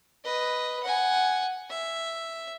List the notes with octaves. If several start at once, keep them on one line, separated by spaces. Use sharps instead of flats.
B4 D#5
F#5 G#5
E5